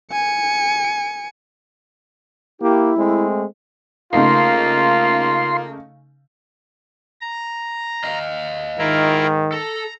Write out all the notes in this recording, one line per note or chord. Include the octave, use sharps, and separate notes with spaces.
G#5 C#7
A#3 E4 G4
G#3 A3 C4
C#3 A3 A#3 D#4 F4 C6
A#5
D#5 F5
G#2 D#3 E4 F4 A#4
A4 A#5